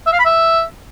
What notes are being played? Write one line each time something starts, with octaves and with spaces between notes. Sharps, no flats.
E5
F5
B5
E5